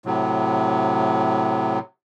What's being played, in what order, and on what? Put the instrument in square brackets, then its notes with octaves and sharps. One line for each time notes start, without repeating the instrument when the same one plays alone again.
[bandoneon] A2 C3 F#3